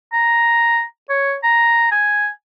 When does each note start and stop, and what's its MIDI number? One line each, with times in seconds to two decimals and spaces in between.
0.13 0.82 82
1.09 1.35 73
1.43 1.90 82
1.91 2.28 80